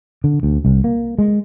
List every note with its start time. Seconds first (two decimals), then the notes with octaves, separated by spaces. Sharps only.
0.24 D3
0.43 D2
0.65 C2
0.84 A#3
1.18 G#3